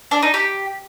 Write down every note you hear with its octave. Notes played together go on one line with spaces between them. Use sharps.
D4
D#4
G4